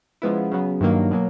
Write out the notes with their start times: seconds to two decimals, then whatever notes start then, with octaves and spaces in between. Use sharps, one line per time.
0.22 C#3 F3 G#3 B3 E4
0.51 C#3 F#3 B3
0.81 G2 D#3 F#3 A#3
1.11 B2 F#3 A#3